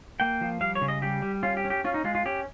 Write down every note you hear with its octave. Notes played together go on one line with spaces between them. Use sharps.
A#3 G5
F3
G3 F5
C#5
C#3
D#5
G3 G4
G3
C#4 F4
G4
C#4
G4
C#4 F4
D#4
G#3 F4
F4
C#4 G4